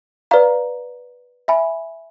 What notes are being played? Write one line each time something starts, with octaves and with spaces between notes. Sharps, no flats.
B4 D5 F5 A#5
E5 G#5 B5